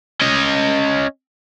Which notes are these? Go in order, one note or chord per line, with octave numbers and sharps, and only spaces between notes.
C#4 D#5